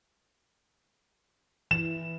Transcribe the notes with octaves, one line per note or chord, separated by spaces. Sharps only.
E3 E7